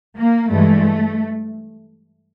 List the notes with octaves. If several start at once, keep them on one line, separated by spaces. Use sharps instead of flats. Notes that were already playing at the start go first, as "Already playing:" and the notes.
A#3
G2 E3 G#3 A3